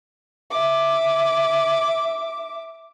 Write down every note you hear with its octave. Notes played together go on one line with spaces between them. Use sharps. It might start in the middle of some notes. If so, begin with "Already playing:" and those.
E5 D6